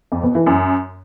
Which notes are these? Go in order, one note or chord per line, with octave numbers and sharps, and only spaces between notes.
F2
B2
E3
F#2